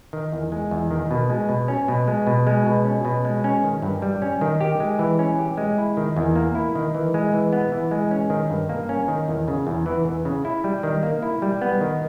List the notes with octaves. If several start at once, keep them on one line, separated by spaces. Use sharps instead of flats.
D#3
E2
G#3
E2
D#3
B2
G#3
B2
C#4
B2
G#3
B2
G#3
B2
C#4
B2
G#3
C#4
D#3
G2
G3
C#4
D#3
G4
G#3
E3
C#4
G4
G#3
E4
D#3
E2
A#3
E4
D#3
E3
G#3
E3
B3
E3
G#3
C#4
D#3
G2
A#3
C#4
D#3
E2
C#3
E2
E3
E2
C#3
E4
G3
D#3
A#3
E4
G3
B3
D#3